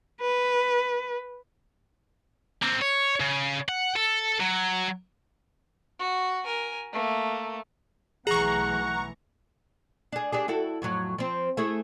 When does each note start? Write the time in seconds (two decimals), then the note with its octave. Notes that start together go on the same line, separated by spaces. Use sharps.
0.21 B4
2.62 A#3 C4
2.82 C#5
3.20 C#3
3.69 F#5
3.96 A4
4.40 F#3
5.99 F#4
6.45 A#4 G#5
6.93 A3 A#3
8.27 B1 E3 A3 G#4 F#5 A#5 C#6
10.12 D4 G#4
10.33 D4 G4 G#4
10.48 E4 F#4 A4
10.82 F2 A2 F#3
11.18 F3 C4
11.57 A3 E4 G#4